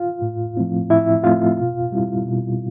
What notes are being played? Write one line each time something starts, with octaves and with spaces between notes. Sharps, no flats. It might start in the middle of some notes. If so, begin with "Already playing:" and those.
Already playing: F4 F5
A2
F3 A3 C4 E4
A2 E4 E5
F3 A3 C4 E4 F4 F5
B2
G3 C4 E4
B2